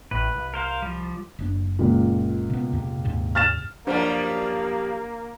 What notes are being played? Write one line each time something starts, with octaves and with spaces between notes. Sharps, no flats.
A1 A2 B4
C2
A#4 C5 F5
F3 G3
F#1 C#3 D4
C#2 A#2
C3 B3
E2 C3
D#2 G#2 C3
F6 A6 E7
F#2 F3 G3 A#3 D4 A#4 C5